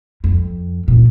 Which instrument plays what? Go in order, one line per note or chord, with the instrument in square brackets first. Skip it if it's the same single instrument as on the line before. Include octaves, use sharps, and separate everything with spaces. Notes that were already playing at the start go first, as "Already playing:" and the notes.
[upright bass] F2
A#2